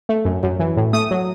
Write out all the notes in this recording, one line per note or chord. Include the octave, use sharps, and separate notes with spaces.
A3
F#2
F#2
E3
A2
A3 D#6
F#3